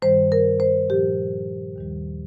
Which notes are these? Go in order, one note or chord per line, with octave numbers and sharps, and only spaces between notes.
G2 D#3 G3 C5
A#4
C5
A#2 F3 G4
D#2 D#3 G3